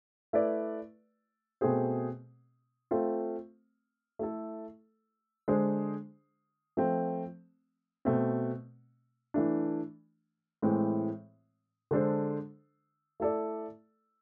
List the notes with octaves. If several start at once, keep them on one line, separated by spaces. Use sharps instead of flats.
A3 E4 B4 D5
B2 A3 C4 G#4 C5
A3 C4 F4
A3 E4 A4
D3 G#3 D4 G#4 C5
F3 A3 C4
B2 A3 C4
E3 A3 D4
A2 E3 G#3 C4
D3 G#3 D4 A4 C5
A3 E4 A4 D5